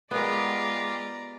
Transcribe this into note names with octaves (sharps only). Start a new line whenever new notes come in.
G#3 B3 F4 G4 A#4 D5 A#5